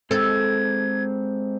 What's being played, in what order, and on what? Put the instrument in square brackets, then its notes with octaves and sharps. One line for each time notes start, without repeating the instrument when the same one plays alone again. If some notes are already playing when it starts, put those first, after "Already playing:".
[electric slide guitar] G#3 C4 [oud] A4 [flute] G#6